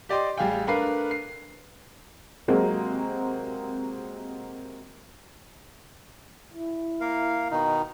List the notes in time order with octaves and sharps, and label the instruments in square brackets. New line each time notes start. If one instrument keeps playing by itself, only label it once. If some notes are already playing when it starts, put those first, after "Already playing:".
[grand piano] G4 D5 D#5 C6
A1 G3 G#4 F5 G5
A3 D4 A#4 B4 F5 C7
C7
[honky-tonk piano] C3 F#3 G#3 A#3 C4
[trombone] E4
[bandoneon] A#3 A#4 F5
B2 D#3 D#4